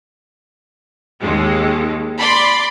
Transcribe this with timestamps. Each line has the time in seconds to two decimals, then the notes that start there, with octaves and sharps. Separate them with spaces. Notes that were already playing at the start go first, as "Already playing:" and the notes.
1.21 D#2 G#3
2.19 D5 B5 C6